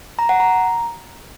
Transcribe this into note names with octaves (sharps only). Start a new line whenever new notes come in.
A#5
F#5
A#5